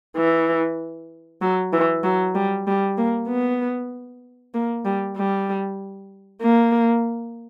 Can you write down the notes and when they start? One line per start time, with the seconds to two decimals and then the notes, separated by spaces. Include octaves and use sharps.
0.17 E3
1.42 F#3
1.73 E3
2.04 F#3
2.35 G3
2.67 G3
2.98 A#3
3.29 B3
4.54 A#3
4.85 G3
5.16 G3
6.42 A#3